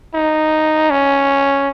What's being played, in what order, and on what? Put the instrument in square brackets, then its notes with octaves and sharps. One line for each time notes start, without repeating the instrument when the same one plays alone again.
[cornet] D#4
C#4